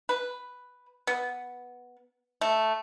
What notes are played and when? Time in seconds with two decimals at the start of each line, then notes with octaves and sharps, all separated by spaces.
0.09 B4
1.07 B3
2.41 A3